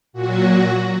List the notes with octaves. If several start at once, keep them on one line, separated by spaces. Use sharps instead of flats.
A#2 F#3 F#4